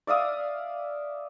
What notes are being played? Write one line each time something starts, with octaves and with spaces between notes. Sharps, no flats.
D5 E5 F5 D#6